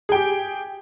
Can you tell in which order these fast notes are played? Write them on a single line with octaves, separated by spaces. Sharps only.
G#4 G5 G4